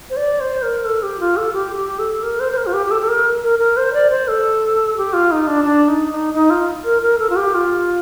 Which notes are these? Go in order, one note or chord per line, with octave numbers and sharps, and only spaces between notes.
C5
D5
C5
A#4
A4
G4
F4
A4
G4
G4
A4
A#4
C5
C5
A#4
F4
G4
G4
A4
A4
A#4
A#4
A#4
C5
D5
C5
A4
G4
F4
D#4
D4
D4
D#4
D#4
D#4
F4
A#4
A#4
A4
F4
G4
F4